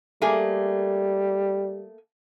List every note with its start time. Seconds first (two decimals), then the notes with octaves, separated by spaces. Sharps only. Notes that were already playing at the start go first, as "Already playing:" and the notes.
0.22 G3 A3 A#3 G#4